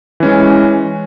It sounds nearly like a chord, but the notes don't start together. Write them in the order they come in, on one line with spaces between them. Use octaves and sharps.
E3 C#4 G#3